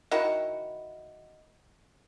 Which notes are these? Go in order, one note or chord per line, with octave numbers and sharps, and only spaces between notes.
D#3 E4 F#4 F#5